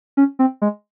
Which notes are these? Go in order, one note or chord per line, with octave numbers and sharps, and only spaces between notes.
C#4
C4
G#3